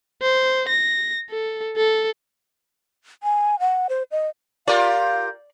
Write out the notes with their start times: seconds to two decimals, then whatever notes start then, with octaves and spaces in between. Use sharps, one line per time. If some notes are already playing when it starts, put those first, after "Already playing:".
0.22 C5
0.68 A#6
1.30 A4
1.76 A4
3.23 G#5
3.60 F#5
3.89 C5
4.11 D#5
4.68 F4 G4 A#4 D5 F5